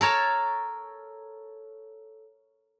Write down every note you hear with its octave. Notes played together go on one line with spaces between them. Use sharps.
A4 A#4 C#5 A5